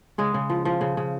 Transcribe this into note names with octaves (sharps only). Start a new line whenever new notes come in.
C#3 G#3
C#3
F3
F3
C#3
C#3